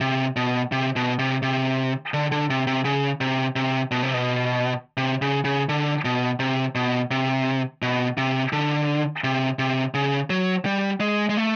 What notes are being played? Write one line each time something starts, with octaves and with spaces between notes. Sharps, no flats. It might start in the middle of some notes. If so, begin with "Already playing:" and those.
C3
B2
C3
B2
C3
C3
D3
D3
C3
C3
C#3
C3
C3
B2
C3
B2
C3
C#3
C#3
D3
B2
C3
B2
C3
B2
C3
D3
C3
C3
C#3
F#3
G3
G#3
G#3
A3